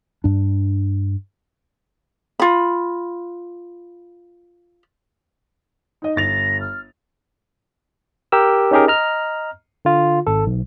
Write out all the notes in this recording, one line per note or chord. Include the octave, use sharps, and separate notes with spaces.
G2 D4
F4 B5
D#4 D#5
G1 A6 A#6 F7
F6
G4 A#4 E6
C#4 D#4 G4 G#4 A#4
D#5 A#5 F6
D3 F4
G#1 A4
B1